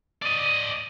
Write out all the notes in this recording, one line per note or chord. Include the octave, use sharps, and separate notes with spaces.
D5 D#5